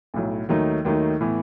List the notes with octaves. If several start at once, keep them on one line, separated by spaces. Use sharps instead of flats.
B1 A2 F#3
D#2 D#3 F#3 A3 D#4
D#2 D#3 F#3 A3 D#4
A2 E3 B3